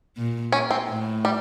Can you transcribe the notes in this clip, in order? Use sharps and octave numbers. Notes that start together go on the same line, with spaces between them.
A#2
C#4
C4
A2
G3